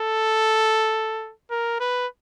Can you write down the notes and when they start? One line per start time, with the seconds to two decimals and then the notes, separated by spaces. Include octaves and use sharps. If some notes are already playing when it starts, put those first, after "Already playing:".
Already playing: A4
1.51 A#4
1.80 B4